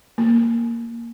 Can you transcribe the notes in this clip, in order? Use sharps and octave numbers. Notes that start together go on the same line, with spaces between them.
A#3